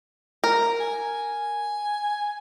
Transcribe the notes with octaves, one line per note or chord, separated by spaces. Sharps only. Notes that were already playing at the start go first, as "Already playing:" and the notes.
A#4
G#5